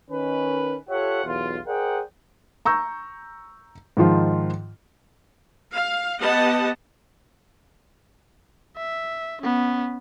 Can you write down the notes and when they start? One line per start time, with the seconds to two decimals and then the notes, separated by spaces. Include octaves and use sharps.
0.10 D#3 C#4 B4
0.89 F4 G4 A4 C#5 E5 F#5
1.25 B1 E2 F4
1.66 G#4 A#4 C5 D5 F#5 G5
2.65 A#5 C#6 E6 G6
3.97 G#2 D#3 F3 F4
5.74 F5
6.19 B3 G4 D#5 F#5 A5
8.77 E5
9.42 B3 C#4